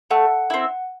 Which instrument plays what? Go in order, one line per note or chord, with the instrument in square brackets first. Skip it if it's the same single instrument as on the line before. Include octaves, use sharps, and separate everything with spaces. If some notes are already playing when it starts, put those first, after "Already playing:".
[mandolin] A3 [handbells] F#5
[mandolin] C4 E4